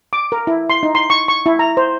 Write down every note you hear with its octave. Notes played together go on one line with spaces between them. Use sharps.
D6
A#4
E4
C6
D#4
C6
C#6
C#6
E4
A#5
C5